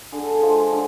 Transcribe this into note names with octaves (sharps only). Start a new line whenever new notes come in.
D3 G#4
A4
G#4
F3 G#3
D3